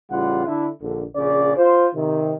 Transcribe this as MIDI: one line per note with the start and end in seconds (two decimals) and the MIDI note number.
0.12 0.45 33
0.12 0.45 49
0.12 0.45 55
0.12 0.45 65
0.12 0.45 78
0.47 0.69 50
0.47 0.69 62
0.47 0.69 64
0.82 1.04 34
0.82 1.04 50
1.16 1.55 34
1.16 1.55 49
1.16 1.55 61
1.16 1.55 74
1.57 1.88 65
1.57 1.88 72
1.95 2.34 48
1.95 2.34 51